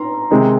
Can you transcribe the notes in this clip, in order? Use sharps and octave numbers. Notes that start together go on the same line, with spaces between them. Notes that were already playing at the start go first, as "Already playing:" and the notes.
Already playing: A#5 C6
C3 D#3 G#3 D#4